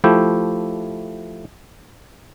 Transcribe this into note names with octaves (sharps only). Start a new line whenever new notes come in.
F3 A3 E4 G4 G5